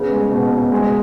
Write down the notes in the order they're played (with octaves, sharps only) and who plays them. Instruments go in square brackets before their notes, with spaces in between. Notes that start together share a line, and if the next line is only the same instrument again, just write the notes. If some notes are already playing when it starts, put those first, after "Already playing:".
Already playing: [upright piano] C#3 [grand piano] B3
[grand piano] G#3
B2
B2
G#3